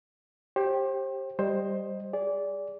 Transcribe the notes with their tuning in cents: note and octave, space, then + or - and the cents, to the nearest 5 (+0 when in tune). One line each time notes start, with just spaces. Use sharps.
G4 +0 C5 +35
G3 +0 C5 +15 D#5 +0
G#4 -20 D5 -20